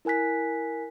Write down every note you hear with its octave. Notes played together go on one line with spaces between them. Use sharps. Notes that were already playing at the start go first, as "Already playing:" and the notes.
E4 A#4 G#5 F#6 B6